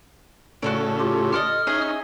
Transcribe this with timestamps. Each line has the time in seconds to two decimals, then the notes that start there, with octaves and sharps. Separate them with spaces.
0.62 A2 C#3 F#4 A4 D5
1.00 F4 G4
1.32 A4 D5 D#5 F6
1.67 C#4 D#4 G#4 D#5 E5